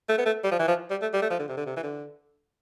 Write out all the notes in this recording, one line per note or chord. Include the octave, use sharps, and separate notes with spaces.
A3
B3
A3
G3
F3
E3
F3
G3
A3
G3
A3
F3
D3
C3
D3
C3
E3
D3